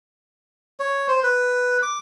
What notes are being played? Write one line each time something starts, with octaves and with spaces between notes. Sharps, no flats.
C#5
C5
B4
D6